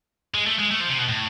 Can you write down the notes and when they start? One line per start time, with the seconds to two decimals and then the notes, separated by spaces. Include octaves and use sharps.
0.35 G#3
0.47 A3
0.59 G#3
0.71 A3
0.81 F3
0.89 C3
0.99 B2
1.08 A2